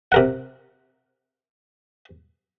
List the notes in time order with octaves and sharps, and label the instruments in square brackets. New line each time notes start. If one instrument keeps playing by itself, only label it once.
[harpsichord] C3 A#4 F#5